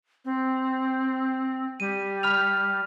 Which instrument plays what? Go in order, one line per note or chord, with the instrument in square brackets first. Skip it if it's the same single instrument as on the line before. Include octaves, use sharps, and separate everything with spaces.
[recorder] C4
[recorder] G3 [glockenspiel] D#7
[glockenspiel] B5 F6 F7